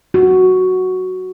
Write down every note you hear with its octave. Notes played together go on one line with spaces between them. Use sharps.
F#4